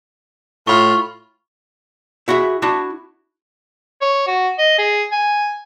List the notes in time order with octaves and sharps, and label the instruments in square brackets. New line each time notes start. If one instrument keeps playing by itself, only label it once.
[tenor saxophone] A2 [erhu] F4 [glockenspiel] B5 C#6
[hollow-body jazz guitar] E4 F#4 G#4 E5
D4 E4 F#4 A5
[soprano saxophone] C#5
F#4
D#5
G#4
G#5